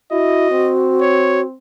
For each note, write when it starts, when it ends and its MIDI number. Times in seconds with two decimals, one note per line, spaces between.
0.11 0.50 64
0.11 1.44 66
0.11 0.72 75
0.51 1.56 60
1.01 1.41 73